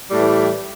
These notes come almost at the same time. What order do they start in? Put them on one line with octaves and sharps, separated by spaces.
G3 A2 A3 E3